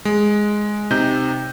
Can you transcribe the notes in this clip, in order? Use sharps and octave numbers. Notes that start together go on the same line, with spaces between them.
G#3
C3 D#4 G6